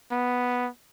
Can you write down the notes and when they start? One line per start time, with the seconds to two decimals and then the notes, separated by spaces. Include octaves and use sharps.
0.12 B3